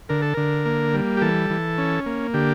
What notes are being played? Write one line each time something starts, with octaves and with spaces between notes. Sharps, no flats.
D3 A#4
A4
D3 A#4
A#3
G3
G4
E3 A4
E3
C#4
A#3
D3 G4